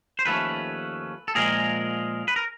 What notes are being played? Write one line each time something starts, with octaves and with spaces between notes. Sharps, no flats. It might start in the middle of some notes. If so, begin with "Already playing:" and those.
C5
D#2 D3 F3 A3 C#4 A4 B4
A4
A#2 F3 G#3 G#4 A#4
B4
A#4